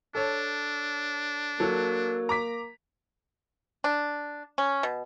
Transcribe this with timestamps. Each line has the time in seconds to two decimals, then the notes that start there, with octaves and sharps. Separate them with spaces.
0.15 D4 A4 C#5
1.60 F#3 A#3 A4
2.29 A#5 D6 B6
3.84 D4
4.58 C#4
4.83 B2